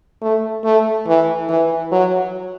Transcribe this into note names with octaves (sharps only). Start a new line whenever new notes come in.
A3
A3
E3
E3
F#3